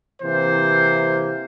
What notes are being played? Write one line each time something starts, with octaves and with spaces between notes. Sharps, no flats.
C3 E3 A#3 C5